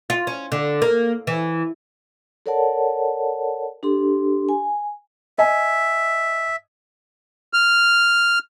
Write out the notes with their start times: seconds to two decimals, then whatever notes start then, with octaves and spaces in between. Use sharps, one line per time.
0.10 F4
0.27 C#4
0.52 D3
0.82 A#3
1.27 E3
2.46 A4 A#4 C#5 D5 F#5 A5
3.83 D4 G4 A4 C6
4.49 G#5
5.38 D#5 E5 G#5
7.53 F6